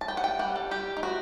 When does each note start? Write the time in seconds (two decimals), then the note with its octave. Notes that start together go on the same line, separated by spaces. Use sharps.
0.01 A5
0.08 G3 G5
0.17 F#5
0.24 G5
0.39 G3 F#5
0.56 A4
0.71 G3 G4
0.97 D#4
1.03 G3 F#4